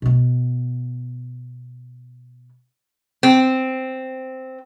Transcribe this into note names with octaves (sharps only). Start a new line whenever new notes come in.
B2 B3
C4